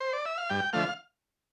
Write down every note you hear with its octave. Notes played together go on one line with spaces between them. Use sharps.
C5
D5
E5
F5
G2 G5
D3 F3 A3 F5